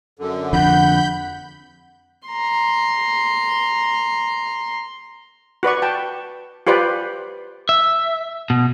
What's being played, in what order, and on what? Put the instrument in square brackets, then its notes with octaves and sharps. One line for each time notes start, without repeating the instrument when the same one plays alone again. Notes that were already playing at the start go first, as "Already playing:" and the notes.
[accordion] F#2 D3
[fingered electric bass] F2 D3 [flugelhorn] F#5 [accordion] B5 G6
[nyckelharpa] A#5 C6
[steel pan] F#4 B4 D5 C#6
G5 A5
F4 G4 B4 C5 D5
[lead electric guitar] E5
B2